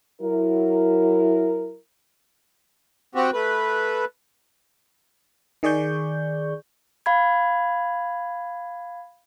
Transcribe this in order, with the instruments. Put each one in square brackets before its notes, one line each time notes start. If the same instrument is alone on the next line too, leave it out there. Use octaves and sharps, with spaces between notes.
[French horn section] F#3 E4 A#4
[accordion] C4 F#4 G4
A3 B4
[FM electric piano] D#3 G#4 D5 C#6 G6
[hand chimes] F5 B5 G#6